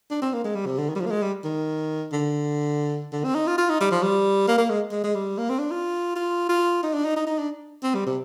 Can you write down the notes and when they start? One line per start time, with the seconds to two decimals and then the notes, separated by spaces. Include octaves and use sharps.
0.11 D4
0.22 C4
0.33 A#3
0.44 G#3
0.55 G3
0.66 C3
0.78 D3
0.89 D#3
0.95 G3
1.00 F3
1.06 A#3
1.11 G#3
1.22 G3
1.44 D#3
2.13 D3
3.13 D3
3.24 C4
3.35 D#4
3.47 F4
3.58 F4
3.69 D#4
3.81 G3
3.91 F3
4.03 G3
4.48 A#3
4.58 A#3
4.70 G#3
4.92 G#3
5.04 G#3
5.15 G3
5.38 A#3
5.49 C4
5.59 D4
5.71 F4
6.16 F4
6.49 F4
6.83 D#4
6.94 D4
7.05 D#4
7.16 D#4
7.27 D#4
7.39 D4
7.83 C4
7.95 G3
8.06 C3